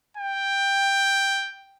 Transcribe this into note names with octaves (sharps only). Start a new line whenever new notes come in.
G5